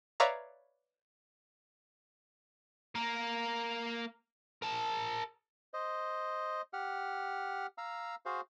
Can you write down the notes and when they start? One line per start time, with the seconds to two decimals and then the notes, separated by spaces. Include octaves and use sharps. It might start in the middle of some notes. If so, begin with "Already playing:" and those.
0.20 B4 C#5 D5 E5 F5 A#5
2.95 A#3 A#4
4.62 A#4 A5
5.74 C5 D#5
6.73 G4 F#5 F6
7.78 F5 A#5 E6
8.26 F#4 G#4 C5 F5